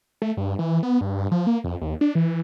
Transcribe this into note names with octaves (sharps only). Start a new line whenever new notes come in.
A3
G2
E3
B3
G2
G2
F3
A#3
F2
D#2
D4
E3